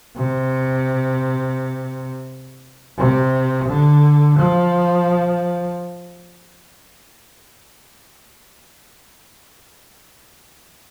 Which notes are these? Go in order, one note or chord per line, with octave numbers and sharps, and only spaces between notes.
C3
C3
D3
F3